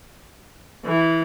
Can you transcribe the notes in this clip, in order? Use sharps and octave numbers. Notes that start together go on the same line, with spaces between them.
E3